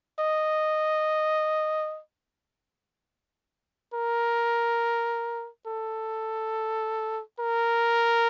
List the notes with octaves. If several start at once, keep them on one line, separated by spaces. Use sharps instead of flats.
D#5
A#4
A4
A#4